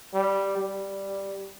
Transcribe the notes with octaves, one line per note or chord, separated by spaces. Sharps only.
G3
G3